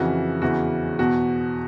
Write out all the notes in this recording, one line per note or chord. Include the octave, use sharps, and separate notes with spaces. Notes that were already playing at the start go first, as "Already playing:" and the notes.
Already playing: F2 C#3 E3 F#4
E2 C#3 E3 F#4
E2 B2 F#4